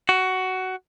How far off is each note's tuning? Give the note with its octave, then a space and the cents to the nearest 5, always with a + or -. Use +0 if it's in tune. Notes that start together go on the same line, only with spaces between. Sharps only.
F#4 +15